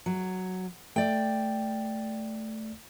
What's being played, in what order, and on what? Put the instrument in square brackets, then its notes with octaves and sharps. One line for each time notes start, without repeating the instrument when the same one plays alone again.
[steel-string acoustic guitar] F#3
[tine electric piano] A3 [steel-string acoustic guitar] D5 G5